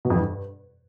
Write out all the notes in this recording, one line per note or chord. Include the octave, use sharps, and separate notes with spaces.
B2
F2
E3
G2